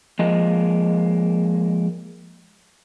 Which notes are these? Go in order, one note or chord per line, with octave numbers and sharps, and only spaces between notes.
F3 G#3 A#3 D#5